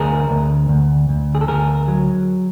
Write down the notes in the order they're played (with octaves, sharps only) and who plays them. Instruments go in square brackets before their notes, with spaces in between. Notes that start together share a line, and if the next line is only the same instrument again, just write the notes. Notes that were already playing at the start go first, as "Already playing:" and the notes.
Already playing: [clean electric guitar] D2 G#4 A#4
D2
D2
D2
G#4
A4
D2 G#4 A#4
F#3